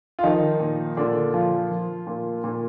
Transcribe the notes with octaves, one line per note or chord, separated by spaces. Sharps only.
F4
D#3 F3 D#4
A#2
A#2 D3 D4
F3 F4
F3
A#2
A#2